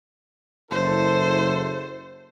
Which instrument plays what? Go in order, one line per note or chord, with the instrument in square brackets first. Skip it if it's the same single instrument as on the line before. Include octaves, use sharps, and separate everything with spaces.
[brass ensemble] F#1 E4 A4 [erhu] C5